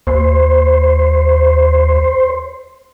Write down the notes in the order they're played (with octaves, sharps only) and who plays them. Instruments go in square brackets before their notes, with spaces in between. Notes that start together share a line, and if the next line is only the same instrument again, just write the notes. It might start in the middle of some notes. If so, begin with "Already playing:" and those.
[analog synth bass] D#2 [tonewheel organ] C5